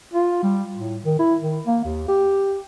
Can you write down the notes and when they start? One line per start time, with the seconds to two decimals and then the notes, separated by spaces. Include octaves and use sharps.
0.14 F4
0.43 G3
0.76 A2
1.05 D#3
1.19 E4
1.42 D#3
1.66 A#3
1.85 D#2
2.08 G4